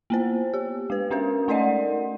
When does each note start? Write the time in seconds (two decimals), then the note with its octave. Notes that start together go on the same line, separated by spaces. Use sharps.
0.10 A#3 B3 C5
0.54 G4
0.90 G#3 B4
1.10 G#3 C#4 F#4 A#4
1.48 A3 D#4 A#4 D5 D#5 F#5